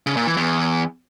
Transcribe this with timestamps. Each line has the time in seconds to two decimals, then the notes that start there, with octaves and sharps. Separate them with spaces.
0.07 C#3
0.17 A#2
0.27 E3
0.37 E2